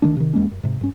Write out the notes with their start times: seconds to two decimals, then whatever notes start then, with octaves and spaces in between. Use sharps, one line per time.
0.02 D2 D#3 G#3 D4
0.17 C3 D#3
0.33 D#2 G#3 A#3 C#4
0.51 F#2
0.63 G#2 C3
0.81 G2 C#4